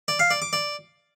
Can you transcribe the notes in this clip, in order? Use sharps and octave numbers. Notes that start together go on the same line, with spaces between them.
D5
F5
D5
D6
D5